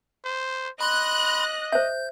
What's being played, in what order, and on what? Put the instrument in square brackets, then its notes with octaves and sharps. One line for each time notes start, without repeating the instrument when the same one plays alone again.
[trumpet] C5
[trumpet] D#5 [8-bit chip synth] B5 C6 [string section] F#6 A#6
[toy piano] C5 E5 [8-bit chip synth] G6